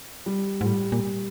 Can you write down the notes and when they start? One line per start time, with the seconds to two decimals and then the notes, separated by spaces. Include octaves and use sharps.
0.26 G3
0.61 G#2
0.65 A2 G3
0.92 A#2